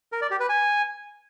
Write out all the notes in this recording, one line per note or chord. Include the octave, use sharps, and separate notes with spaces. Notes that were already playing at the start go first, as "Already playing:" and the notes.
A#4
D5
G4
B4
G#5